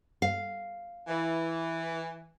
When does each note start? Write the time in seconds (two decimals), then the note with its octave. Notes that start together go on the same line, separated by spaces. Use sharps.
0.22 F5
1.08 E3